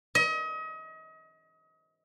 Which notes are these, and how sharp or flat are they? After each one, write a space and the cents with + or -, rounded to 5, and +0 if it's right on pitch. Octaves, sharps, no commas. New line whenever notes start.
D#5 +35